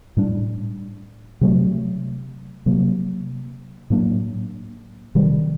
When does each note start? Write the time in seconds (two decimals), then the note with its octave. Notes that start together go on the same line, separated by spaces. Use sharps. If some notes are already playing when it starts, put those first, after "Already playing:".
0.17 A2 G3 D4
1.41 C3 F#3 A3
2.66 C3 F#3 A#3
3.90 A2 F#3 A#3 D4
5.15 C3 D#3 G3